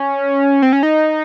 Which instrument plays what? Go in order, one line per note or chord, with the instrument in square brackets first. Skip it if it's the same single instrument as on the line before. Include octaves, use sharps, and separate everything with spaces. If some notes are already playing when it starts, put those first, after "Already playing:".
Already playing: [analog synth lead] C#4
C4
C#4
D#4